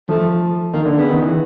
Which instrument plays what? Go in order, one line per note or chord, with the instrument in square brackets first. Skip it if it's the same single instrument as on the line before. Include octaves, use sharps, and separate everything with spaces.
[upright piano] F3 [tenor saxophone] A3
[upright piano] D#3 [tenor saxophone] A#3
[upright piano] D3
[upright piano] C#3 [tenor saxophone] B3
[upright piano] D#3
E3